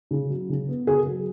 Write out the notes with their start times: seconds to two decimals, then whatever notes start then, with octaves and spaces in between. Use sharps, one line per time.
0.11 C#3
0.30 F#3
0.49 C#3
0.68 B3
0.87 C#3 G#4
1.06 F#3